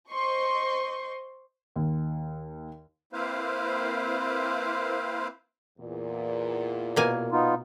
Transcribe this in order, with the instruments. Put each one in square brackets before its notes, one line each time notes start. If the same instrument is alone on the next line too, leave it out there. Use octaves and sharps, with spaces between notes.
[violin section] C5 D#5 C6 C#6
[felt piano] D#2
[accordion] A#3 C4 E4 B4 C5 F5
[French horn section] E2 A#2
[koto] B2 A#3 G#5
[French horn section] A#2 [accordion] B3 D#4 F4